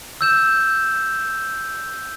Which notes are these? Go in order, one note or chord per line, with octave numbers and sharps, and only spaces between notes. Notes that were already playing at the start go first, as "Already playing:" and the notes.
E6 G6 E7